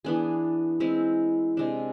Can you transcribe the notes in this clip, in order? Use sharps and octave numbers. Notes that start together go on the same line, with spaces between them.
E3 B3 D4 G#4
G#3 C4 E4
C3 G#3 D4